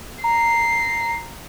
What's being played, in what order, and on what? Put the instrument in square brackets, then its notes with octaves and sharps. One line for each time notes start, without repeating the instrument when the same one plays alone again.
[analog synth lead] A#5 [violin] C7